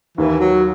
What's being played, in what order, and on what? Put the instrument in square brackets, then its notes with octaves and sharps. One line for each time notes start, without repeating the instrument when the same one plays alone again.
[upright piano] D#2 [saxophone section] E3
[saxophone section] F#3